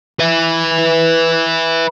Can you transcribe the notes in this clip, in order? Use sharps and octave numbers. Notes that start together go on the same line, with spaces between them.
B4 E5